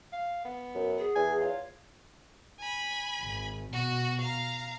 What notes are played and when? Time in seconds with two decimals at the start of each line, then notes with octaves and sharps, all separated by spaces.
0.12 F5
0.45 B3
0.75 F#2
0.99 G#4
1.16 E2 G#5
1.41 F4 C#5
2.60 G#5 B5
3.22 G#1
3.73 B2 F#4
4.21 F5 A#5